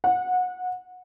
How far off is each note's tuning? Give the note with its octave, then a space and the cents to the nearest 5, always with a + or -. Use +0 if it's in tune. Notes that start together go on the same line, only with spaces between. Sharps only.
F#5 -20